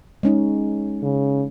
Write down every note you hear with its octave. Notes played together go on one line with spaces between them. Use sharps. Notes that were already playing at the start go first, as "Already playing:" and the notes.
G#3 C#4 D#4
C#3